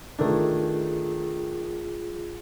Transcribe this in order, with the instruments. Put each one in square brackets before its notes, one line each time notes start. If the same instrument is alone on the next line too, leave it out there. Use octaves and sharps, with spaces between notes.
[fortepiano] D#3 A3 D4 [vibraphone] F4 G#4